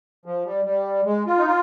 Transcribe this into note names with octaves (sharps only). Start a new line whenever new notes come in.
F3
G3
G3
G#3
F4
D#4
F4